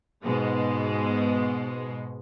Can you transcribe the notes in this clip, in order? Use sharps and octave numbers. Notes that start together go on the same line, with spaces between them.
G#2 B2 G#3